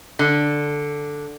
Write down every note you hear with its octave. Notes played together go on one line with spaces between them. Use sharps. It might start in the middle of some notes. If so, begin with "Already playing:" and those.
D3